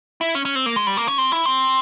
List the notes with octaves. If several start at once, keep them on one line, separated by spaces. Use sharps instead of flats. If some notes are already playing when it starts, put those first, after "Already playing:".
E4
C#4
C#4
C4
A#3
G#3
G3
A#3
C#4
C4
E4
C4